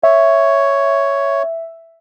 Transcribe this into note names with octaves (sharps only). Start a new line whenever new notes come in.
C#5 E5